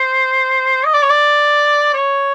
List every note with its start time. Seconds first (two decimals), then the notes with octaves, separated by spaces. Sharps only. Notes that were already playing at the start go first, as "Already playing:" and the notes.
Already playing: C5
0.86 D#5
0.94 D5
1.02 C#5
1.10 D5
1.94 C#5